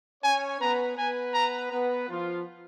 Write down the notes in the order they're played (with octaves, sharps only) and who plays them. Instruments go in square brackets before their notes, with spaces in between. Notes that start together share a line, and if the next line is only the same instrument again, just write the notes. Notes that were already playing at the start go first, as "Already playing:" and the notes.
[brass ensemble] C#4 C#5 [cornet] G#5
[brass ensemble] B3 B4 [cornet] A#5
[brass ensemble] B3 B4 [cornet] G#5
[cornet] A#5
[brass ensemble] B3 B4
F3 F4